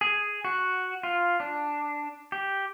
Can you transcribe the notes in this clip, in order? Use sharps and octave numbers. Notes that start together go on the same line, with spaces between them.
G#4
F#4
F4
D4
G4